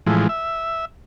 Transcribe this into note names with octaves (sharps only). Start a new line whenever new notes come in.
A2 E3 F3 G#3
E5